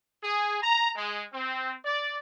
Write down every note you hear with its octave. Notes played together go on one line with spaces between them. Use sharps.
G#4
A#5
G#3
C4
D5